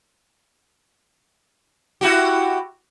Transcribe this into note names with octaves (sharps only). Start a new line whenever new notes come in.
E4 F#4 G4